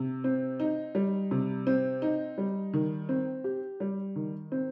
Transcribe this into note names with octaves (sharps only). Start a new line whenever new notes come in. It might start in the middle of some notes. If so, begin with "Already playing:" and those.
Already playing: C3
C4
D#4
G3
C3
C4
D#4
G3
D#3
C4
G4
G3
D#3
C4